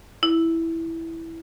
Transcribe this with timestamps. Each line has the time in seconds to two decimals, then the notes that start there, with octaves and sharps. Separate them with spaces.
0.23 E4